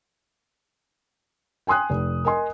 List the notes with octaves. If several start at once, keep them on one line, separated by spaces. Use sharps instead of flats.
G5 G#5 C6 D#6 F#6
F1
A#4 D#5 G#5 C6